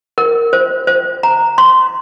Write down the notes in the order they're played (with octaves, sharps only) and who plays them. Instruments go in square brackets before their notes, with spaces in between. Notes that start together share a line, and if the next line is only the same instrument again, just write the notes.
[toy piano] A#4
C5
C5
A#5
C6